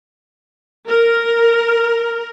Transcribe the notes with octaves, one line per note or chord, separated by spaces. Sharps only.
A#4